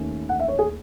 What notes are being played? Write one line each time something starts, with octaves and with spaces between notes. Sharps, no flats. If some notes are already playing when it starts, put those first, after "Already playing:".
Already playing: D#2 D#3 A3 C#4
F#5
E5
C#5
G#4